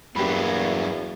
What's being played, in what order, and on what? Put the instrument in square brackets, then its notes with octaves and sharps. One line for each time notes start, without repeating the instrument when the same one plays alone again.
[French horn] E2 [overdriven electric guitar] G2 F#3 [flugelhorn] A#3 [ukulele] D4 G4 B5